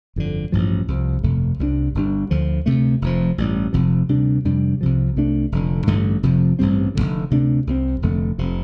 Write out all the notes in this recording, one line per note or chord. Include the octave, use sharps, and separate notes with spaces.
G1 F2 D3
A1 G2 F3
C2 C3 F3
G1 F2 C3 A3
C2 C3 G3 D4
G1 G2 G3 D4
D2 D3 F3
D2 C3 A3
F1 F2 F3
A1 G2 G3
F1 F2 C3 F3
D2 C3 G3 D4
F2 C3 G3 D4
C2 C3 F3
C2 C3 A3 D4
F1 F2 D3
A1 G2 D3 A3
F1 F2 C3 F3
A1 G2 G3 C4
F1 F2 D3
D2 C3 A3 D4
C2 C3 F3 C4
F1 F2 D3 A3
F1 F2 C3